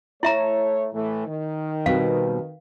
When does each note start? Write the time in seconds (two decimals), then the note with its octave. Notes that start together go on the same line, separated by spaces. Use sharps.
0.23 A3 E4 C#5 E5 A#5
0.93 A2 E3 A3
1.27 D#3
1.86 B2 G3 C4 F5